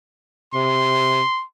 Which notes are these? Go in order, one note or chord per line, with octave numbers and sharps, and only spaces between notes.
C3 C6